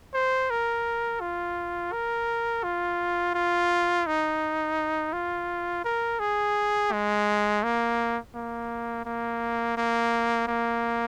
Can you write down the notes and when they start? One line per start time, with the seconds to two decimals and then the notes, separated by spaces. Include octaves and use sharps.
0.14 C5
0.50 A#4
1.21 F4
1.93 A#4
2.64 F4
3.35 F4
4.07 D#4
5.13 F4
5.85 A#4
6.20 G#4
6.92 G#3
7.63 A#3
8.35 A#3
9.05 A#3
9.78 A#3
10.48 A#3